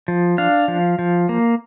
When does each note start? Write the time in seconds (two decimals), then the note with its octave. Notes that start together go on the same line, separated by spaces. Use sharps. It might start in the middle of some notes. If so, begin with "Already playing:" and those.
0.08 F3
0.38 D4 F5
0.68 F3
0.99 F3
1.29 A#3